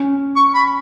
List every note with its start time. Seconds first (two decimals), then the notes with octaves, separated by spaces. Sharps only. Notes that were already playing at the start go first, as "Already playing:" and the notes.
Already playing: C#4
0.36 C#6
0.54 B5